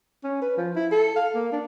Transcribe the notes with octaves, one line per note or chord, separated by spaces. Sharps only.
C#4
B4
F3
E4
A4
F5
A#3
D4